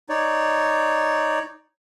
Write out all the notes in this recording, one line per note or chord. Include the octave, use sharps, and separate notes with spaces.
D#4 C#5 D5